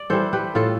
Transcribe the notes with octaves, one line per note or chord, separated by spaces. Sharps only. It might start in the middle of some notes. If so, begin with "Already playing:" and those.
Already playing: D5
E3 G3 A4 C5
G4 B4
A2 F4 A4